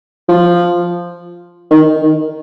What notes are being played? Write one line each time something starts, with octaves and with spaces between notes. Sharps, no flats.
F3
D#3
D#3